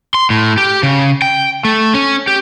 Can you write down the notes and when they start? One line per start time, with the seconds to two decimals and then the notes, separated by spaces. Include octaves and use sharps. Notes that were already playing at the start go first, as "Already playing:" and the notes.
0.14 C6
0.30 A2
0.58 G4
0.83 C#3
1.22 G5
1.65 A3
1.94 C#4
2.27 G4